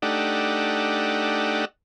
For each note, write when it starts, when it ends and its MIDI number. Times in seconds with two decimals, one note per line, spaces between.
0.02 1.65 57
0.02 1.65 62
0.02 1.65 63
0.02 1.65 67
0.02 1.65 78